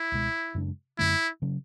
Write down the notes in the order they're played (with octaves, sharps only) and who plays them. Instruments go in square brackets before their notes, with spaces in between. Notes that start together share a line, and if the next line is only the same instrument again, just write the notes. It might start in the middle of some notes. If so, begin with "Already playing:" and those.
Already playing: [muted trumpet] E4
[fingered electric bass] C#2 B2 G#3
F#2 C#3 G#3 D4
[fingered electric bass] F#2 D3 A3 [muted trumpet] E4
[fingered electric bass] C#3 F#3 C#4